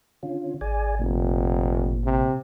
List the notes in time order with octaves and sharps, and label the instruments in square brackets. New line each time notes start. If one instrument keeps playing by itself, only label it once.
[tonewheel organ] D3 C#4 F4
[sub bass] G#1 [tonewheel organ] G#4 D5 G#5
[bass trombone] F1 [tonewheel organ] A#2
[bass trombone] C3